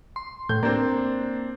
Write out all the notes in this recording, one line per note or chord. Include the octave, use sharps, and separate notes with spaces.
C6
A2 G6
A#3 C4 D4